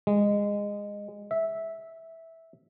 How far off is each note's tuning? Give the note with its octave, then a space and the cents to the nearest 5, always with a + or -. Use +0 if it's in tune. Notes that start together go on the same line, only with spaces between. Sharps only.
G#3 -20
E5 -10